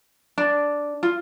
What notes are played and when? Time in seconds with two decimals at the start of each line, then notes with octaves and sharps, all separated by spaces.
0.38 D4
1.03 F4